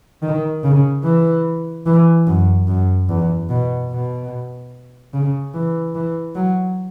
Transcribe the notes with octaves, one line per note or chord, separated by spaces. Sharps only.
D#3
C#3
E3
E3
F#2
F#2
E2
B2
B2
C#3
E3
E3
F#3